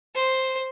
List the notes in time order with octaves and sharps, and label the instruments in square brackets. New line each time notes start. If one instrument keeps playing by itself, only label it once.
[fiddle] C5